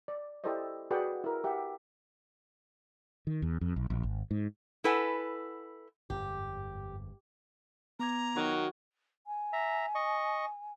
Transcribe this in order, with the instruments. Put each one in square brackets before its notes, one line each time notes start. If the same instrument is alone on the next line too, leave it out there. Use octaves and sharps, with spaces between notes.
[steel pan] D5
E4 G4 A4 C5 D5 D#5
F#4 G#4 B4 D5 F#5 G5
E4 A#4
G4 E5 F#5
[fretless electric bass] D#3
E2
F2
B1
A#1
G#1
G#2
[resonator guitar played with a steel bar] E4 A4 B4 F#5 G#5
[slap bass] G1 F2 G#2 [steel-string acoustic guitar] G4
[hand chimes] B3 D6 G#6 [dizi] A#5
[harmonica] D#3 [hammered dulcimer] F#3
[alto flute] G#5
[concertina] E5 A#5
D#5 C#6